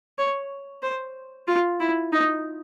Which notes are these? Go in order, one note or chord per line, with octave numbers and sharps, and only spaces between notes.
C#5
C5
F4
E4
D#4